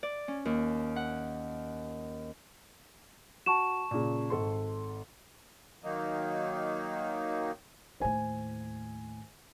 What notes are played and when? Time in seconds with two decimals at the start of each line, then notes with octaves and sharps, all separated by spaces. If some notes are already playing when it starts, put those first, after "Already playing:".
0.03 D5
0.28 C#4
0.45 D#2
0.96 F#5
3.46 F#4 A5 C#6 E7
3.91 A#2 C#3
4.30 G#1 A4 C6
5.83 D#3 F#3 A#3 D#4
8.00 D#2 A2 C5 G#5